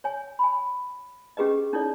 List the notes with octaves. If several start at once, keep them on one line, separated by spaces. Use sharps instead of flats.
C#5 G#5
G#5 B5
C#4 G4 G#4 B4 D#5
C#4 D#4 E4 A4 C#5 D5